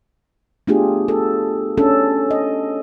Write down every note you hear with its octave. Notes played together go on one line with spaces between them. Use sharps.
A3 B3 D4 F4 G4 G#4
A4
C#4 D4 A4
D#5